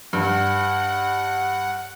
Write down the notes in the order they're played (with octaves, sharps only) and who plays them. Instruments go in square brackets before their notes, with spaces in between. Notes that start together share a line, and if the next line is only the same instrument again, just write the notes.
[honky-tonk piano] G2 [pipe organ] F#5